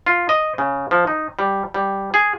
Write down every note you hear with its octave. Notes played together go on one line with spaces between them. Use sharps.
F4
D#5
C#3
F3
D#4
G3
G3
G#4